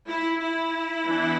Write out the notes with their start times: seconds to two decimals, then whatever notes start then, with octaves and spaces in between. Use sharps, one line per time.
0.09 E4
0.41 E4
1.05 E3 B3 D4